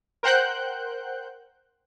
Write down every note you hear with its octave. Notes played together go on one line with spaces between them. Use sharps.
A#4 C5 F#5 G5 F#6 G6